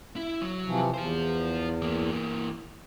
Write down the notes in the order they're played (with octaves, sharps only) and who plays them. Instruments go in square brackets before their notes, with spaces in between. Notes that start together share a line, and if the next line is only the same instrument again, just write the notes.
[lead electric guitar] E4
F#3
[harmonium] C3 E3 F3
[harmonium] E2 [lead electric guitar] F4 C5
[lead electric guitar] E3 A#3